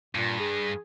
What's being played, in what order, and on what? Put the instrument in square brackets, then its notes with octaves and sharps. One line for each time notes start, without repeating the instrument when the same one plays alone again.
[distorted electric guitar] G2 [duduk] A#2
[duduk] G#4